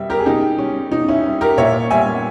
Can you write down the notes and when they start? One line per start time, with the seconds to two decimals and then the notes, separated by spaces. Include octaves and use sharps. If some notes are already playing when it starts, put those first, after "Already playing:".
Already playing: B2 G3 E5
0.10 G4 A#4
0.20 G#4
0.26 B2 D#4 G4
0.58 G3 C#4
0.92 B2 D#4
1.08 C#4 E4
1.26 G3
1.41 G4 A#4
1.57 A#2 C#5 E5
1.91 G3 E5 G#5